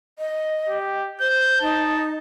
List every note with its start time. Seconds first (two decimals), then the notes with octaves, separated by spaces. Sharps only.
0.19 D#5
0.69 G4
1.21 C5 G6
1.61 D#4 A5